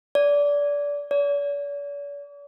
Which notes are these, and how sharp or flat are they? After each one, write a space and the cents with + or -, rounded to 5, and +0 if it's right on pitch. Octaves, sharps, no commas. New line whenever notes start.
D5 -25
D5 -45